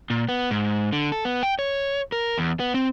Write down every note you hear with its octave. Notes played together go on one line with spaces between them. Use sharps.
A#2
B3
G#2
D3
A4
B3
G5
C#5
A#4
E2
B3
C4